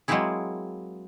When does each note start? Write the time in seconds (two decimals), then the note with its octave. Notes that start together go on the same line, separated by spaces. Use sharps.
0.08 F#3 G#3 A#3 C4 E4 G#4